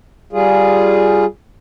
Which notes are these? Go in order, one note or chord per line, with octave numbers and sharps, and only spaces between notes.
G3 F4 G#4